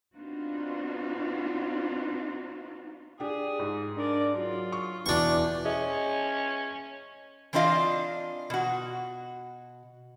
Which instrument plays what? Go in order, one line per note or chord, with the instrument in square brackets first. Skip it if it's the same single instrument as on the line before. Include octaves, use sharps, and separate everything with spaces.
[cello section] B3 C4 D4 D#4 F4 F#4
[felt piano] D4 G4 [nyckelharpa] G#4
[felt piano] G#2
[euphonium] D4 [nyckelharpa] A#4 D5
[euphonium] F#3 [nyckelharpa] F4
[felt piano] C#6
[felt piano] E2 B2 D6 [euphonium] E3 [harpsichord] D4 C#6
[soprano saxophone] C#4 [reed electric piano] G#4 D#5 E5
[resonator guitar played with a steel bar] E3 C4 D4 F4 D#5 F5
B2 F#4